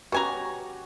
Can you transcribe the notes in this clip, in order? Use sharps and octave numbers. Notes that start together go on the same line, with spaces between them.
B2 C#4 F#4 G4 G#5 A#5